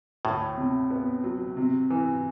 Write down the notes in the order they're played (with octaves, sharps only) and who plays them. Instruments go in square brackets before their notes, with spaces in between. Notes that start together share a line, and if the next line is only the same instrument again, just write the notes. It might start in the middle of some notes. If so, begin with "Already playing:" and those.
[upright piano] D2 [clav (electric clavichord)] A2
[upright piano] C3
B3
F#3
C3
E3